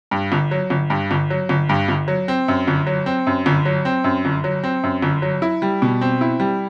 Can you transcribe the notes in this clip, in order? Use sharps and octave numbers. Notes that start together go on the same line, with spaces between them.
G2
G1
F#3
G1
G2
G1
F#3
G1
G2
G1
F#3
C4
F#2
G1
F#3
C4
F#2
G1
F#3
C4
F#2
G1
F#3
C4
F#2
G1
F#3
E4
G3
B2
C4
E4
G3